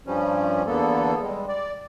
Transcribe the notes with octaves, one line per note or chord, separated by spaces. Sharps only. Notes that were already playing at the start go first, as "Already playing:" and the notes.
G2 F3 G3 C#4
E2 D3 A#3 B3 A4
G3 G#3
D5